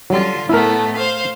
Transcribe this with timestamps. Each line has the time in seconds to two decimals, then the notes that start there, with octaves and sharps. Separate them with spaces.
0.10 D3 F#3 G3 F4
0.49 A2 A3 B3 E4 A#4
0.96 C5 F5